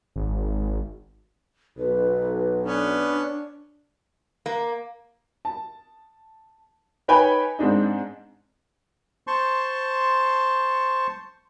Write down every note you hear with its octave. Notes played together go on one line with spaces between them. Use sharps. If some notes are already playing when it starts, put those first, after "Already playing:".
G#1
B1 B4
B3 C#4 D4
A#3
A5
D#4 B4 C#5 G5 G#5 B5
G#2 C4 D4 D#4
C5 A5 C6 C#6